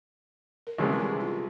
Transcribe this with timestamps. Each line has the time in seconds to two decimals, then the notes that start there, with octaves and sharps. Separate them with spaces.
0.67 A#4
0.78 C2 C3 E3 G#3 C#4 G#4
0.92 G#4
1.00 G4
1.20 F4